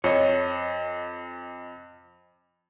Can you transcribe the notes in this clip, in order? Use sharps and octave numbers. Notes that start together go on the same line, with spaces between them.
F2 C#5 D#5